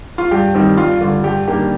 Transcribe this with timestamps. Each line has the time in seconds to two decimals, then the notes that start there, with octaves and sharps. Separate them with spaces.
0.18 F4
0.31 G2 G4
0.55 D#3 G3 C4
0.77 G2 F4
1.01 D3 G3 D4 F4
1.23 G2 G4
1.47 D#3 G3 A#3 D4 G4